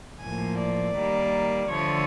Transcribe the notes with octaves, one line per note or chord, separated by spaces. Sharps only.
A2 F3 A#3 G#5
D5
D#3 G3 A#3
D3 F3 A3 C#5